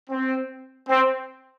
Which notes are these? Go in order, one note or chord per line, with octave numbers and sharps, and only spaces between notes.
C4
C4